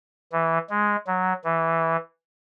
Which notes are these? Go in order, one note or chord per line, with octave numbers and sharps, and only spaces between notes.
E3
G#3
F#3
E3